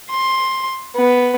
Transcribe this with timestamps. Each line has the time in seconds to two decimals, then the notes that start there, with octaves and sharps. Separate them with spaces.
0.11 C6
0.96 B3